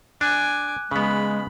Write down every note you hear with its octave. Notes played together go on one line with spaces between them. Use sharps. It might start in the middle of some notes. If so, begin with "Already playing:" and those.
D4 G#5 D6 F#6
C#3 G#3 B3 B5